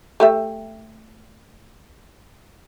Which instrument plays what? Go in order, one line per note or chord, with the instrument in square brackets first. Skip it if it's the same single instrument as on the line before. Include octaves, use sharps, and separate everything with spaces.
[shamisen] A3 G4 E5